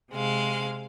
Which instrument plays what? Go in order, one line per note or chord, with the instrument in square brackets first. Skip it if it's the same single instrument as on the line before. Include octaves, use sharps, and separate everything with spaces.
[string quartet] C3 G#3 F5